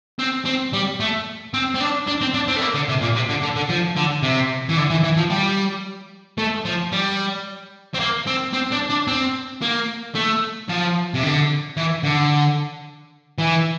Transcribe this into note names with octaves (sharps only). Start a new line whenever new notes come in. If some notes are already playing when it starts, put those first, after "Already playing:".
C4
C4
G3
A3
C4
C4
D4
D4
C4
D4
C4
A3
A#3
D3
C3
A#2
C3
D3
D3
D3
F3
D3
C3
E3
D3
E3
E3
F3
G3
A3
F3
G3
C4
A#3
C4
C4
D4
D4
C4
A#3
A3
F3
C3
D3
E3
D3
E3